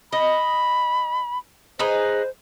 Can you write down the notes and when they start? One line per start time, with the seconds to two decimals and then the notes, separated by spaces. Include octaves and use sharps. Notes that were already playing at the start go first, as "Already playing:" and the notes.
0.13 D#5 B5
1.79 D#4 G#4 B4 C5